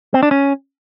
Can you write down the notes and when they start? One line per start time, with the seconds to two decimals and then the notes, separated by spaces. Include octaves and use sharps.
0.14 C4
0.23 D4
0.31 C#4